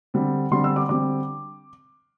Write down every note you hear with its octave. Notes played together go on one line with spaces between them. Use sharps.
D3 G3 C4
D3 G3 C4 C6
E6
D6
D3 G3 C4 D6